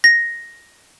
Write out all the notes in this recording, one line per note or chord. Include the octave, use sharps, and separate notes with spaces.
A#6